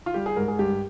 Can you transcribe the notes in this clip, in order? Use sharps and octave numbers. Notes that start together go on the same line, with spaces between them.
F4
G3 G4
G#4
G#2 A#4
G#4
G2 G4